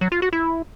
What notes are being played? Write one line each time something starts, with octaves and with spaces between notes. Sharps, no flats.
F#3
F4
F#4
E4